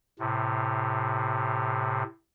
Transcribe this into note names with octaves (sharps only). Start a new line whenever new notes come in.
A2 C3